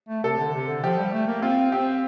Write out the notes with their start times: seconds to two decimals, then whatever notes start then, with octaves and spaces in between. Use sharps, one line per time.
0.09 A3
0.24 C3 A4
0.39 D3
0.54 C3
0.68 D3
0.83 F3 G4
0.98 G3
1.12 A3
1.27 A#3
1.42 C4 F4
1.72 C4 G4